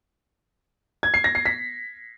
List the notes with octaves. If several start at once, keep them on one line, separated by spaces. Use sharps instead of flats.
G#6
C7
A#6
C7
B6